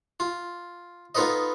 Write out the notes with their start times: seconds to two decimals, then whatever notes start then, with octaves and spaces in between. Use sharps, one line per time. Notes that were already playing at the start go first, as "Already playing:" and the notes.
0.20 F4
1.15 B3 D#4 F4 A4 B4 D#5